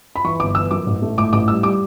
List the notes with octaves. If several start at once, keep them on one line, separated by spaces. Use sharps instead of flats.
B5
E3 C#6
G1 D6
E3 E6
F#2 D6
A1
A3
A2 D6
A1 D6
G3 E6
G3 D6